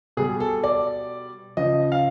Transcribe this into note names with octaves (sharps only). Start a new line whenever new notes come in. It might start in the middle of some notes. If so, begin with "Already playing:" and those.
B2 G3 G#4
A4
D5
C#3 F3 D#5
F5